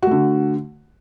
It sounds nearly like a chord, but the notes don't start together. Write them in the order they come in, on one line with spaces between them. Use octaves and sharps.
F#4 A3 D3